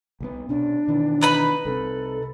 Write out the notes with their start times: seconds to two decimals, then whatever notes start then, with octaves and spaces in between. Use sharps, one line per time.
0.20 C2 G3 B3
0.49 B2 C#4 D4
0.88 B2 D#3 E3
1.21 D#4 B4 B5
1.65 C2 C3 A4